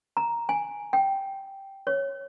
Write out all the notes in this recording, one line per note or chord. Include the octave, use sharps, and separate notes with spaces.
A#5
G#5
G5
C#5